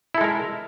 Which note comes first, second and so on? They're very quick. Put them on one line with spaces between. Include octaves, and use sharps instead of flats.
E4 A4 G#3 A#4